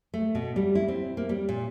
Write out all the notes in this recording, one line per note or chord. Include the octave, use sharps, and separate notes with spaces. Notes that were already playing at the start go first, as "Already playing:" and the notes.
A3
B2
G3
E4
C4
A#3
G3
A#2